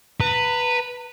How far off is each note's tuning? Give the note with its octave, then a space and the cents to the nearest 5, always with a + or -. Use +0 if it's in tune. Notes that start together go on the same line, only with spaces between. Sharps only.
B4 +0 A#5 -35